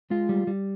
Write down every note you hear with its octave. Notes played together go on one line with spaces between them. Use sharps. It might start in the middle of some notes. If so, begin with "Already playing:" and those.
G#3 F4
G3
G3